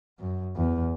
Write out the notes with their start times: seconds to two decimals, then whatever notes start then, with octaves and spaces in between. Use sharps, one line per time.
0.19 F#2
0.56 E2